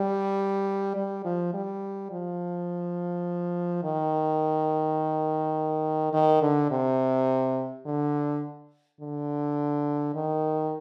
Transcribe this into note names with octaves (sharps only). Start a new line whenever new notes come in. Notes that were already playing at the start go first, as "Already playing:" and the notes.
Already playing: G3
G3
F3
G3
F3
D#3
D#3
D3
C3
D3
D3
D#3